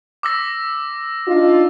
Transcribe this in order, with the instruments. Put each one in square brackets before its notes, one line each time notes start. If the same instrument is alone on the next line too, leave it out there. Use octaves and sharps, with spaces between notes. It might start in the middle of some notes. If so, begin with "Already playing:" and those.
[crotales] D6 E6 A#6
[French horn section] D4 D#4 F4